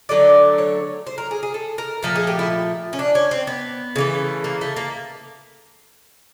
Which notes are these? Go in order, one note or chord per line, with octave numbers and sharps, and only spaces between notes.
D3 F#3 A3 D5
C#5
C5
A#4
G#4
G#4
A4
A#4
A#2 F3 A3 A#4
G#4
G4
E4
C#4
D4
C#4
C4
B3
C#3 E3 A3
A#3
A3
A#3